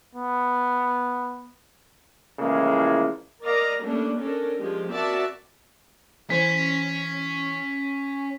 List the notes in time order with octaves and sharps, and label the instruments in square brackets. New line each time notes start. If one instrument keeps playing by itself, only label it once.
[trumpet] B3
[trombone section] A2 C#3 E3 F3 G#3 A#3
[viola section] A#4 D5 D#5 F5 A#5
G3 A3 A#3 C#4 D4
C#4 D4 A4 A#4
F3 G#3 G4
C4 F#4 A#4 D5 E5 A5
[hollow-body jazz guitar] E3 C5 [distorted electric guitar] C#4 [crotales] B6